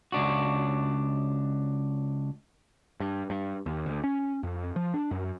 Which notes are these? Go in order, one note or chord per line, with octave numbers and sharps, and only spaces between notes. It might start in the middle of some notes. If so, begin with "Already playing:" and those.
C#2 D4 F#4
G2
G2
D#2
D2
C#4
F2
F3
D4
F#2